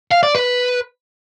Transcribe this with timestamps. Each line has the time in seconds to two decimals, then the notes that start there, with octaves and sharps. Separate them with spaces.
0.11 F5
0.23 D5
0.35 B4